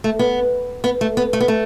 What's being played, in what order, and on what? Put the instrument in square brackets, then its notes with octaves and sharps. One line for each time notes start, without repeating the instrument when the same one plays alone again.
[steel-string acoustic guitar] A3
B3
B3
A3
B3
A3
B3
A3